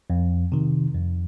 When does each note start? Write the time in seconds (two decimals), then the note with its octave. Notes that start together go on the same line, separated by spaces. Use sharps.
0.10 F2
0.52 C3 D#3
0.95 F2